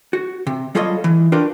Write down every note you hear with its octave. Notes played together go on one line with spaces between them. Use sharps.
F#4
C3
F#3 G3 F4 A4 C#5 D#5
E3
D4 F4 G4 A#4 B4